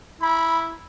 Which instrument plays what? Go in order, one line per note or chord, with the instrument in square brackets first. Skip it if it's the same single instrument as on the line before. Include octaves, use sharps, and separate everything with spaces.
[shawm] E4 [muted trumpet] B5